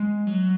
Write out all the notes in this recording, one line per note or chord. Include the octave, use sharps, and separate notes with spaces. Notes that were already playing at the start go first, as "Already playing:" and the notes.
Already playing: G#3
F#3